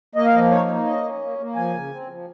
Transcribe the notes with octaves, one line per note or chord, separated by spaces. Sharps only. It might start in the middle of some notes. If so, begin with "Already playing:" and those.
A#3 D#5
F5
F3 D#5
D#4 C#5
A#3
C#4 D#5
C#4
A#3
A#3
F3 G#5
C#3
C4
F3